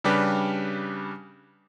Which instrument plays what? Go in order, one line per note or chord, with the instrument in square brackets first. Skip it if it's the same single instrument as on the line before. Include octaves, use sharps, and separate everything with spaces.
[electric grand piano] C#3 G3 D4 G4 B4